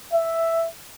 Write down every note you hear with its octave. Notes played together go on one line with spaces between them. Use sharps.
E5